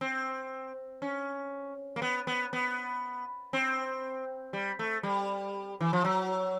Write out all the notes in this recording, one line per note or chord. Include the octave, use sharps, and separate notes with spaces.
C4
C#4
A#3
B3
B3
B3
C4
G3
A3
G3
E3
F3
F#3